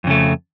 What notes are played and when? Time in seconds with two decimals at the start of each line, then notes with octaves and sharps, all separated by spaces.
0.04 F2
0.07 C#3
0.10 A3